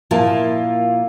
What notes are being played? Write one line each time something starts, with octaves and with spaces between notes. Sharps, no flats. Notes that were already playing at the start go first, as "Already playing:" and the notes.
A#2 F3 A#3 E4 F4 A5